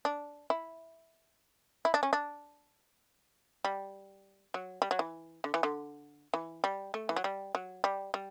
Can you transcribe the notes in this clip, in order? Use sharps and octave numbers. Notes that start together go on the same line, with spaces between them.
D4
E4
E4
D4
C#4
D4
G3
F#3
G3
F#3
E3
D3
E3
D3
E3
G3
A3
E3
F#3
G3
F#3
G3
G3